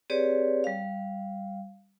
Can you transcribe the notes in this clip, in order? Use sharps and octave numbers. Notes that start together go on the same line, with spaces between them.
C4 G4 G#4 B4 C#5 D5
G3 F5